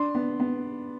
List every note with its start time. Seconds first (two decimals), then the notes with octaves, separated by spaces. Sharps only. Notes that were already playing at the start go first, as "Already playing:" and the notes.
Already playing: D4 C6
0.15 B3
0.40 B3